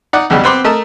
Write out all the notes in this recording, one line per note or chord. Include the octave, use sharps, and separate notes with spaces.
D#4 D5 F#5
B1 E2 G2 C#3 G3
B3 C4 C6 D6
A3 A#4 D#5 A5